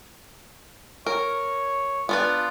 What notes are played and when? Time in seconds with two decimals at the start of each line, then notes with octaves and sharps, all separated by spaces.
1.06 A#4 C#5
2.09 B3 D4 F4 B4